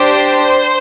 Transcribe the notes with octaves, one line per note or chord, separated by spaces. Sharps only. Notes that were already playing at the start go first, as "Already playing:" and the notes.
Already playing: D4 G4 C5